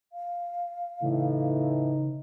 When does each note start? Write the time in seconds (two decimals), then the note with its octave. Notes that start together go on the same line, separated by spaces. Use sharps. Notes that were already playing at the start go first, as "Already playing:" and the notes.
0.13 F5
1.02 A2 C#3 E3 D#4